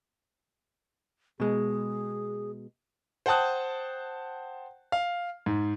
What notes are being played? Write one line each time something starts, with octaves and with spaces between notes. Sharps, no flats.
B2 G#3 G#4
C5 F#5 G5 A5 D#6 F#6
F5
G#2